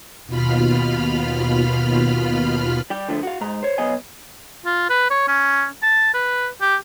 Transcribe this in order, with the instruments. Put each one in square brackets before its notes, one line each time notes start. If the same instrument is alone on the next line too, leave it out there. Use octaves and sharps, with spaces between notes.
[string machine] D#2 B2 F4 B5 F6
[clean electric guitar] G3 G4
D3 F3 A3
F#4 F5
G#2 A#5
C5 C#5
B1 B3 C#5 D#5 F5 G#5
[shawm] F4
B4
C#5
C#4
A5
B4
G4